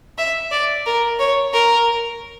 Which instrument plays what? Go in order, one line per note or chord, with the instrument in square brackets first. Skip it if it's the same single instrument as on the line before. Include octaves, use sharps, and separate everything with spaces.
[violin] E5
D5
A#4
C#5
A#4